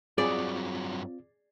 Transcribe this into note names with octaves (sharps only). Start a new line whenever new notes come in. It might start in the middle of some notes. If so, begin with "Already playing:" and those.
G2 F#3 C4 F4 G#4 D5